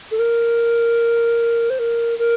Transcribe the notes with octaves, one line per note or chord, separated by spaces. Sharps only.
A4
A#4
C5
A#4
A#4